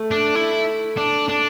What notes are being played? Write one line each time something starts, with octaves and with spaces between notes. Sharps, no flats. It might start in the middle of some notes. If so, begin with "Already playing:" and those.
Already playing: A3
D4
E4
D4
D4